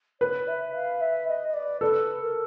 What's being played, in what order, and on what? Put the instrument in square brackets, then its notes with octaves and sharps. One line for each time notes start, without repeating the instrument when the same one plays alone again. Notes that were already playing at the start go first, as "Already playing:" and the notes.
[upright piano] B4 [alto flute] C#5
[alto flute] E5
F5
E5
D#5
D#5
D5
[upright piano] A4 [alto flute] B4
[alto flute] A#4